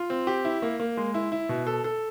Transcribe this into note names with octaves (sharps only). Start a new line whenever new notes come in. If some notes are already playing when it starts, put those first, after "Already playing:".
Already playing: F4
C4
G4
E4
A#3
A#3
G#3
E4
E4
B2
A4
A4